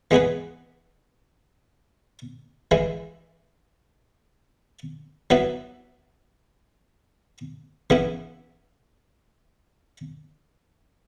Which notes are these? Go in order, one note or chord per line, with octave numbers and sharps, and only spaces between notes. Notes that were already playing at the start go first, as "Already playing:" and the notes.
E3 G#3 B3 G#4 B4
E3 G#3 E4
F#3 B3 E4 B4
C#3 E3 B3 E4